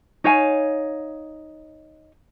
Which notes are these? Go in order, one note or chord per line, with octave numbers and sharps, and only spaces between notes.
D#4 C#5 F5 G#5